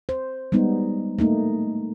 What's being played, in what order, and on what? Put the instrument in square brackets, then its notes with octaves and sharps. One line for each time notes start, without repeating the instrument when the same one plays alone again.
[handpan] C5
G3 G#3 B3 D#4
A3 A#3 D#4